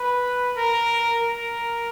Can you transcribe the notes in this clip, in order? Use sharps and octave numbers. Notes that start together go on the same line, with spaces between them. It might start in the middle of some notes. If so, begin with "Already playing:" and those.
Already playing: B4
A#4
A#4